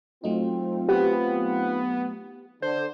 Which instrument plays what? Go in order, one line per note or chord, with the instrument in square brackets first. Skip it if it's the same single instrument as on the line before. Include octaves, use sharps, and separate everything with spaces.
[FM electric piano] F#3 A3 D#4 [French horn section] C4 F4
[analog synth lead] B3 [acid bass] G4
[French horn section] D3 [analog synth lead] C5 [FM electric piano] G6